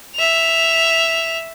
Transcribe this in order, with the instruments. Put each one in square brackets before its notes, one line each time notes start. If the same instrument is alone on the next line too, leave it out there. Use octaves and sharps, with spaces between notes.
[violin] E5 F7